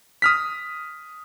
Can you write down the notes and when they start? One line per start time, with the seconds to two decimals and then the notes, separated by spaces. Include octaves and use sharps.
0.22 D#6 F6 B6